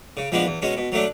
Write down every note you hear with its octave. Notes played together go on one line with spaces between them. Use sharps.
C#3
F3 G#3 B3 D4
E2
B2 G#3 C#4
B2
F#3 A3 D4